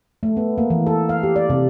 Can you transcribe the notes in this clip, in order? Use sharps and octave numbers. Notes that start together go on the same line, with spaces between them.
A3
B3
A#3
E3
A4
F5
G4
D5
C3